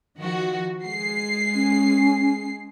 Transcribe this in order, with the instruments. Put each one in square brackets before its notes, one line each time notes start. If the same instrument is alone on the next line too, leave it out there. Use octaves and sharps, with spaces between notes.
[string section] D#3 F3 F#4
G#3 C7
[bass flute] C#4